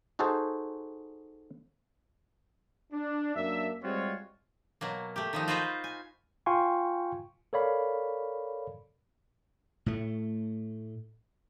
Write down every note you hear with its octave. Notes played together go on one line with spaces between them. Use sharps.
D#4 F#4 G#4 A4 C5
D4
F#2 A#3 D4 E5
G3 G#3 C4 F4 F#4 C#5
B2 F#3 A#3
A3 G4
D#3 F3 D#4
F4 F#4 B4 C5 D#5 A#5
G#5
F4 F5 G5 G#5 C6 C#6
A4 A#4 C#5 D5 F5 B5
A2 A3